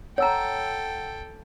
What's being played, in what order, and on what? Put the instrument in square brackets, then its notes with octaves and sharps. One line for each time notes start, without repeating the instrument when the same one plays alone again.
[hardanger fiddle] A4 G5 [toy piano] C#5 A#5 [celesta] F#5 E6